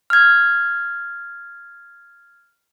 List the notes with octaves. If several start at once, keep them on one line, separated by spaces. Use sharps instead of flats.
F6 G#6